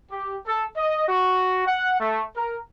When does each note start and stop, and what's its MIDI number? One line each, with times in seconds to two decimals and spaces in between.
0.12 0.36 67
0.47 0.64 69
0.76 1.06 75
1.08 1.65 66
1.67 2.00 78
2.00 2.22 57
2.36 2.57 70